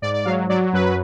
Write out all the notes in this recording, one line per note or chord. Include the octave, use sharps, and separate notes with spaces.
G#2 D5
D5
F#3 F5
F#3 D5
F#2 B4